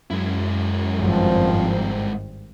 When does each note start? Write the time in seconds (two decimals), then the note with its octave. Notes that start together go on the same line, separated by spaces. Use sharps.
0.11 F#2 G#3 E4
0.98 G#1 G2 F3 C4